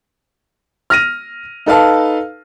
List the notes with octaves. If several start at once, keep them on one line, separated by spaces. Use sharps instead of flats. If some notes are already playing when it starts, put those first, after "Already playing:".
F6 A#6 D#7
D#4 A4 B4 F5 A5